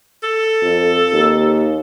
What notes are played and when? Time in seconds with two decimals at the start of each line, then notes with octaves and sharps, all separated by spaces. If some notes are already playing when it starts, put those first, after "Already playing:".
0.23 A4
0.62 F2
1.13 D#2